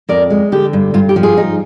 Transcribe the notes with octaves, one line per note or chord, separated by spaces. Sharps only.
F2 A#4 D5
G#3
D3 G4
G2
G2 F4
G4
F3
F4 G#4
D#4